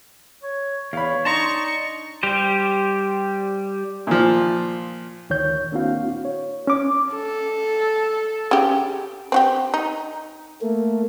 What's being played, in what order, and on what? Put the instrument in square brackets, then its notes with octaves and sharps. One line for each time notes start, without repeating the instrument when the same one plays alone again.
[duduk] C#5
[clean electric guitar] E2 [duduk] C#5 [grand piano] F5 B5
[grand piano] D4 C6 [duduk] D#4 [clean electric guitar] A5 A#5 [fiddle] C#6
[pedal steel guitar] G3 G4 C5
[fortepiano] A#2 F3
[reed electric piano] D2 D#3 C#5 G6
A#3 C4 D4 E4 F#4 F5
C#5
C#4 D6
[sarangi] A4
[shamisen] C#3 G4
C4 F#4 G4
D#4
[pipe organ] A3 A#3